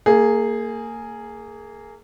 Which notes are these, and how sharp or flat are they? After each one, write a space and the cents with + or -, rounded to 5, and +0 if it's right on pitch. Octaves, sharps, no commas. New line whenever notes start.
A#3 -25 G#4 +0